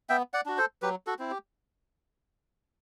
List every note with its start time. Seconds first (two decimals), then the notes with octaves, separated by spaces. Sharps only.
0.09 B3 E5 G5
0.33 D5 F#5
0.46 D4 F#4
0.58 A4 C5
0.82 F#3 G4 B4
1.07 F#4 A4
1.19 C4 E4
1.31 G4